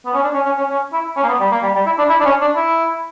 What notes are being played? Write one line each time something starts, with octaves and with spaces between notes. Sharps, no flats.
B3
C#4
D4
C#4
C#4
C#4
C#4
E4
C#4
A#3
B3
G3
A#3
G3
G3
E4
D4
E4
D4
C#4
D4
E4